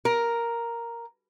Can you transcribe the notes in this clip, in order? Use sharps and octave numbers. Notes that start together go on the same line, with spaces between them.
A#4